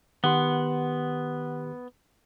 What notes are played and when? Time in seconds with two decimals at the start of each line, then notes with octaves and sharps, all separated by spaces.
0.24 D#3 B3 G4 F#5 C6